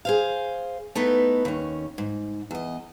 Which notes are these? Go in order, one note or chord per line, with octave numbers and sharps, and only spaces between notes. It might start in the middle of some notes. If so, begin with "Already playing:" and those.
G#4 C5 F5
A3 B3 D#4 E4 B4
D#2 C#4
G#2
E2 D#5